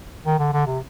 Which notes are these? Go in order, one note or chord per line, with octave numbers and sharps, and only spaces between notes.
D#3
D3
D3
C3